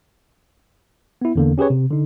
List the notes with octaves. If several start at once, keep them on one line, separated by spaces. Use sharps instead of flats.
B3 E4
E2 D3 A#3
C#4 G4 G#4 B4 C#5
C3
D3 D#4